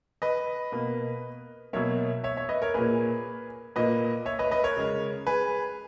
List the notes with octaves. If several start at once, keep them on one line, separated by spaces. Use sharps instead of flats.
B4 D#5
B2 A#3
B2 F#3 A#3 C#5 E5
C#5 E5
C#5 E5
B4 D#5
A#4 C#5
A#2 A#3 G#4 B4
A#2 A#3 B4 D#5
C#5 E5
B4 D#5
B4 D#5
A#4 C#5
C#3 G#3
G#4 B4